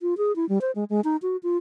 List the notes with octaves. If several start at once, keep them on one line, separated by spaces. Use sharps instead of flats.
F4
G#4
E4
G3
C5
G#3
G#3
D#4
F#4
F4